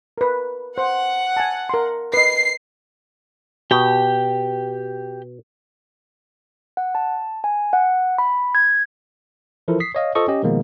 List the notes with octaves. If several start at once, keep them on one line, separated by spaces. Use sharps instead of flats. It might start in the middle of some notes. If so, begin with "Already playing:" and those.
A#4 B4
C5 F#5
G#5 A5
A#4 C6
B4 D#5 C7
B2 G4 G5
F#5
A5
G#5
F#5
B5
G#6
E3 F3 E4 A4 A#4
D#6 B6 C7
C#5 D#5 F5
F4 A4 C5 D#5 C#6 D#6
C#4 G4 D#5
B2 D#3 F3 G#3 A#3 B3